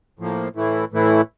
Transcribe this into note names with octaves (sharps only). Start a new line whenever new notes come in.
A2 F3 A#3
A2 E3 A3 E4
A2 E3 A3 E4